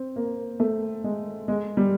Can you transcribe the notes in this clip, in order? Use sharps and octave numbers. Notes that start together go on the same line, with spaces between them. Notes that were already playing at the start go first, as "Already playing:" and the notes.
Already playing: C4
A#3
A3
G#3
G#3
G3